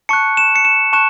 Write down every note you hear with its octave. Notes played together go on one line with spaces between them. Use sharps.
A5 C#6 F#6 C#7
E7
C#7
E7
A5 C#6 F#6 E7